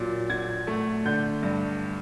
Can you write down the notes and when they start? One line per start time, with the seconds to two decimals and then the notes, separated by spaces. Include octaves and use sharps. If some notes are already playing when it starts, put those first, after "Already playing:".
Already playing: A#2 F#3
0.29 A#2 G#6
0.67 A3
1.05 D3 G6
1.43 G2